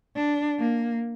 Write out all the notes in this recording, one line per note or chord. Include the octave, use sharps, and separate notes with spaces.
D4
A#3